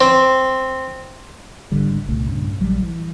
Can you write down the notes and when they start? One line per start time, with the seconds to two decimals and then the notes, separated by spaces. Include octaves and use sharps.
0.01 C4
1.72 G#1 G#2 D3 G3
2.09 C2 A#2 C#3 A3
2.28 G2 A#2 C#3
2.60 A#1 F#3 G3
2.82 E3